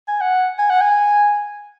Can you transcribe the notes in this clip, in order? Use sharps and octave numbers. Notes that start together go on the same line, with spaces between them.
G#5
F#5
G#5
F#5
G#5